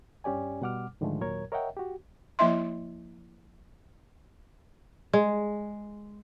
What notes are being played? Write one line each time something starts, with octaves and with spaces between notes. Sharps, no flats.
G2 C#4 G4 D5 G#5
B2 G3 F#5 D6 F6
G#2 D3 D#3 F3 G#3 A3
D#2 A#2 F#3 A#4 C#5 G#6
A#4 C#5 D#5 E5 F#5 G5
F#4 G4
F3 A#3 E4 D#5 E5 C6
G#3